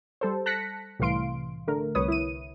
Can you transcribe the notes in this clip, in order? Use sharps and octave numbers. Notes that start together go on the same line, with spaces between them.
G3 A4 C5
A5 F#6 A#6 B6 C#7
C2 A2 E3 F5 C6 D7
D3 A3 A#4
C2 B4 C#5 D#6
E4 D#7